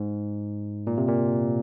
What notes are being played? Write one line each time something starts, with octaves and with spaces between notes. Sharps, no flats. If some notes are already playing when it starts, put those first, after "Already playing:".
Already playing: G#2
A#2
C3
A#2